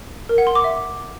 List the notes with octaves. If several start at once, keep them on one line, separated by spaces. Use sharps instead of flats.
A#4
F#5
C6
D6
E5